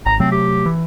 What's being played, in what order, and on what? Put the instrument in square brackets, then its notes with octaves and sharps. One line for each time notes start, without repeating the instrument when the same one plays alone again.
[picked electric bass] G#1 [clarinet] A#5
[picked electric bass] C3 F#3 A3 [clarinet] C4
[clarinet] G4
[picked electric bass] E3